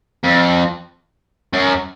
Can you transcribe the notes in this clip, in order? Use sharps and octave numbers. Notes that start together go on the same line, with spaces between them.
F2
F#2